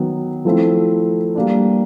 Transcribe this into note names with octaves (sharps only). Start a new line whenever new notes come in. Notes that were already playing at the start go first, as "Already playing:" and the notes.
Already playing: D#3 F#3 B3
F3 A3 C4 E4
G3 A#3 D4